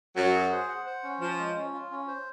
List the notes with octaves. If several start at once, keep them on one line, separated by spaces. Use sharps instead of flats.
F#2 F#3 F#5
G#4
C5
F#5
C5
C#4
F3 F4
G#3
C#4
F4
C#4
C5